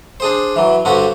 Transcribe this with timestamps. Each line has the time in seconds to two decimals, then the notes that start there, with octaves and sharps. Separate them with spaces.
0.20 D4 G#4 C5
0.56 E3 F#3
0.85 G2 D3 C4 F#4 G4